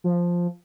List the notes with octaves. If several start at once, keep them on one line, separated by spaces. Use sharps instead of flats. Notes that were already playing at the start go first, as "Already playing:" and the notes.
F3